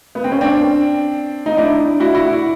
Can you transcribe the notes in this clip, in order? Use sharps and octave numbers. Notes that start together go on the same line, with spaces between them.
B3
C4
C#4
C4 D4
D#4
D4 E4
E4 F#4
E4 F#4